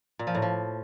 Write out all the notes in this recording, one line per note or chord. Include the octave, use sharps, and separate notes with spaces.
A#2
F3
A2
F3